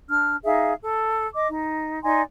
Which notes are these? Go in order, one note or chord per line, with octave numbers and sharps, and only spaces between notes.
D4 F6
D#4 G#4 E5 F5
A4
D#5 D6
D#4
D#4 D5 G#5 C6